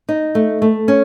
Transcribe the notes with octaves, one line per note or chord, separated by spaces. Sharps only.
D#4
A3
A3
C#4